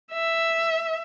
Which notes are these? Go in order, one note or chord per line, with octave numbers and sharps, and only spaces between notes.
E5